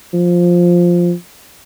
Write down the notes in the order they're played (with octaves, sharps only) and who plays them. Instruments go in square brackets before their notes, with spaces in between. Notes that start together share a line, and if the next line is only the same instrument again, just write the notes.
[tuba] F3